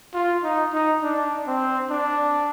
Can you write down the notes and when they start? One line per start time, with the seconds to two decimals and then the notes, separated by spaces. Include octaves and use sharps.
0.14 F4
0.43 D#4
0.73 D#4
1.02 D4
1.47 C4
1.90 D4